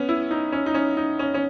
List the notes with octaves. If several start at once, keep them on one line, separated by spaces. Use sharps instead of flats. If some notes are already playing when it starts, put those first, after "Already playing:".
Already playing: B3 C#4
E4
D#4
C#4
D#4
C#4
D#4
C#4
C#4